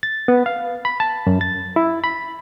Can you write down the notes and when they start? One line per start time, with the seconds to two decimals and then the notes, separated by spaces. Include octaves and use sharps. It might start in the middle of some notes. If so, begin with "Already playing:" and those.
0.03 A6
0.28 B3
0.46 F5
0.85 B5
1.00 A5
1.27 F#2
1.41 A6
1.76 E4
2.04 B5